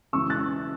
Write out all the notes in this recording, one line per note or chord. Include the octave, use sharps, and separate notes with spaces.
C#3 E3 G#3 C#6 E6
F#6 A6